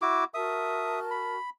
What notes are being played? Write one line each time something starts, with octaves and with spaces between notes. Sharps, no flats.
E4 F#4 D6
F#4 A#4 E5 A5 D#6
B5